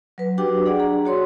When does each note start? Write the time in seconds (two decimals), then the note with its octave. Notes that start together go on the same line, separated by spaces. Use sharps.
0.18 F#3 B4
0.38 D4 F#4 G4 G5 D6
0.65 D4 G#4 D5 F#5
0.80 G#4 A#5
1.05 F#4 C#5 C6